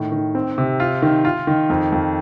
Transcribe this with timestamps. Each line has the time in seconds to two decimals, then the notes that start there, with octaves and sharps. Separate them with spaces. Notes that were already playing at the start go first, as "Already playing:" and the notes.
Already playing: A2 D#3
0.12 D#3
0.35 C4
0.58 C3
0.80 F4
1.02 D#3
1.25 F4
1.47 D#3
1.70 F2
1.92 F2